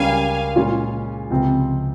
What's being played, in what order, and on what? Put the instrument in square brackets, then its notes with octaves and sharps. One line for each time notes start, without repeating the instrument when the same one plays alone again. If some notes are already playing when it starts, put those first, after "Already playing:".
Already playing: [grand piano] C#2 C#3 G3 A#3 C#4 [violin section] F5 G#5
[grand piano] A#2 G#3 C#4 F4
C#2 C3 F3 C4